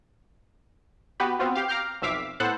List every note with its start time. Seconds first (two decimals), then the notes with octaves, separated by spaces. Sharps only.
1.20 B3 F#4 G4 B4
1.39 B3 C4 F4 F#4
1.55 G4 F5
1.68 F5 A#5 D6 F6 G6
2.02 B1 F2 E5 F5 D6 B6
2.40 A2 B3 A4 C5 F#5 F#6